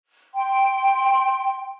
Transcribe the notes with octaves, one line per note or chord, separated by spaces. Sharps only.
G5 C6